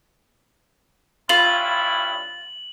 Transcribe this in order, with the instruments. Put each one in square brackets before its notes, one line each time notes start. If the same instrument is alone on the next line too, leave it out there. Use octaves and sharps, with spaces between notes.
[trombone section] G2 C#4 E4 [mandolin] F4 [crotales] F#7